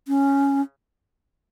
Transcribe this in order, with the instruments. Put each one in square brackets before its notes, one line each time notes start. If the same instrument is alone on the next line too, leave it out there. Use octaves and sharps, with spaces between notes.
[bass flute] C#4